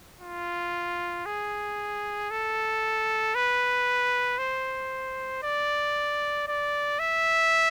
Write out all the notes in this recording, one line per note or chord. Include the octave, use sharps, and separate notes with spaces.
F4
G#4
A4
B4
C5
D5
D5
E5